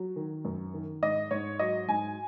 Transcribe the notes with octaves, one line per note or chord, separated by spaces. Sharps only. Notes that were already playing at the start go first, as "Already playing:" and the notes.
Already playing: F#3
D#3
F#2
D#3
G#2 D#5
G#2 C#5
F#3 D#5
G#2 G#5